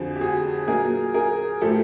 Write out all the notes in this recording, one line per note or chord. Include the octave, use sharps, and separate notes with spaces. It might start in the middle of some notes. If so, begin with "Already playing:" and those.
Already playing: F2 D3 F3 F#4 G#4
G4
F#4 G#4
A#2 F#3 G#4 A#4
G#4 A#4
A2 F3 G4 A4